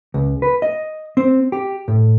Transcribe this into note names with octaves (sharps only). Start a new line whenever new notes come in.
C#2
B4
D#5
C4
G4
A2